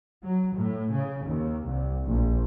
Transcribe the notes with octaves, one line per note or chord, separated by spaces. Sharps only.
F#3
A2
C#3
D#2
C2
A#1